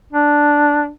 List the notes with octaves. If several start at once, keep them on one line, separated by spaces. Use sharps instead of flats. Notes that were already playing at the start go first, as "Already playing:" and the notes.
D4